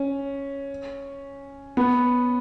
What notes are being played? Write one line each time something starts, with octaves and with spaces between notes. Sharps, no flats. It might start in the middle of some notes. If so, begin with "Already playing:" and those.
Already playing: C#4
B3